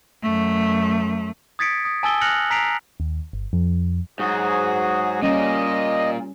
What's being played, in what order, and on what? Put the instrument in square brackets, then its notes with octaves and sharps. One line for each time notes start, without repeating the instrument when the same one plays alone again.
[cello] F#2 A3
[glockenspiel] D#6 G#6 A6 B6 C#7 D7
D#6
G#5 A5 D#6 E6 A6 G7
F6 F#6 A#6 C#7 F7 F#7
A#5 B6 C7 D7 F7
[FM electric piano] D#2
G1
F2
[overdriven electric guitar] G#2 [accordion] F#3 F#4 G#4
[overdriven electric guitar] A#2 A#3 [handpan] G3 C#4 [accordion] D#5